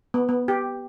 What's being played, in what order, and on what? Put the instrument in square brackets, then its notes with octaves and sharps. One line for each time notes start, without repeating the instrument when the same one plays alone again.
[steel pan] B3
B3
G4